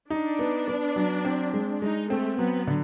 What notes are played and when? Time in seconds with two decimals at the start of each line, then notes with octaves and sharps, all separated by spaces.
0.10 D4 D#4
0.39 B3
0.68 B3
0.96 F#3
1.25 C4
1.54 G#3
1.81 G#3 D#4
2.09 A3 C4
2.39 F#3 B3
2.67 D3